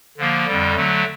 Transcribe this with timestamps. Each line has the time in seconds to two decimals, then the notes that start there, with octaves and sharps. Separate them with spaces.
0.18 D3 F3 A#3
0.46 F2 D3 G3
0.76 D3 F#3 A3